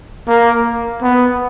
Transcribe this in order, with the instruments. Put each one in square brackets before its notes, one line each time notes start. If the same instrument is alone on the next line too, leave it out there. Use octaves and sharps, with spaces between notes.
[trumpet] A#3
B3